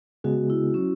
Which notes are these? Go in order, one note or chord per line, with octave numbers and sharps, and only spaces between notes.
C#3 G#3 B3 F#4 G#4
E4
F#3 C#4 E4